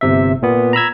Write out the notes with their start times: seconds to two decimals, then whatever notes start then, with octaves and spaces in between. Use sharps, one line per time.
0.01 G1 C3 E5
0.42 A#2 B3
0.73 A#5 B5 E6 G#6